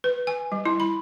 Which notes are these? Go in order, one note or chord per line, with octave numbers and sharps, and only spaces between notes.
B4
G#5
G3
E4
B5